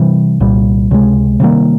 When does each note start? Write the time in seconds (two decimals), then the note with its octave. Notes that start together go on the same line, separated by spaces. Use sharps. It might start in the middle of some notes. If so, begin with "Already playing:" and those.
Already playing: C3 E3 G3
0.40 C2 A#2 G3
0.91 C#2 C3 E3 G#3
1.40 C3 D#3 G3 A#3